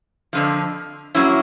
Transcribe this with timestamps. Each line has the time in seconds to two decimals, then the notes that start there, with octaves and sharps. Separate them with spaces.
0.33 F2 D3 F3
1.15 F#3 A#3 C#4 E4